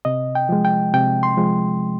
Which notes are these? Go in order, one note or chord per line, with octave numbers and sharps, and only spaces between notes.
C3 D#5
G5
F3 G#3
G5
C3 G5
C6
F3 G#3